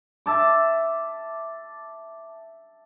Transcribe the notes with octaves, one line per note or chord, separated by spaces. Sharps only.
E5 A5 D6